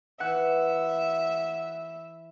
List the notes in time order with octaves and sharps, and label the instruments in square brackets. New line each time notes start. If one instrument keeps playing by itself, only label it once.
[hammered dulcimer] E3 [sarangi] E5 [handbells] F#5 F#6